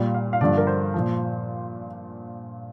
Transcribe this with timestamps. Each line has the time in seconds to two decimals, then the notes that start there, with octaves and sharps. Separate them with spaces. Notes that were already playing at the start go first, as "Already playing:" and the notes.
Already playing: A#2 G3
0.14 F5
0.33 F5
0.41 G2 D3 F3 D5
0.58 A#4
0.67 C5
0.94 A#2 F3